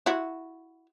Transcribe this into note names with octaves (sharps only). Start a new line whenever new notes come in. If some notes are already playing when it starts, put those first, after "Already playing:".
E4 F#4